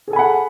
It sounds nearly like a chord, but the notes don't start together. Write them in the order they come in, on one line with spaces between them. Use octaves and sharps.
G#4 A4 G#5 B5 F#5